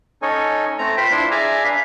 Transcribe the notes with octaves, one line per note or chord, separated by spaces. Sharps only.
C#4 D#4 A4 C#5 G#5
A3 C4 A#5
F4 B4 C5 G5
D4 E4 F4 C5
G#4 D5 E5 G#5 A#5
D4 B4 F5